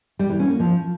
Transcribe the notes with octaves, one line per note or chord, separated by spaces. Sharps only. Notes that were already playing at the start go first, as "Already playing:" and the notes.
G3
E3
C#4
A#3
F3